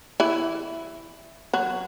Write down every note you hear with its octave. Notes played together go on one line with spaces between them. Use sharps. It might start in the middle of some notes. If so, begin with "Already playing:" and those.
E3 E4
F#3 F#4